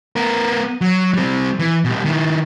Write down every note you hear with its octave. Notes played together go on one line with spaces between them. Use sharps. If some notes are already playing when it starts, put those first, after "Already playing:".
B3 A#4
F#3
G3 C4
E3
B2 G3
D#3 E4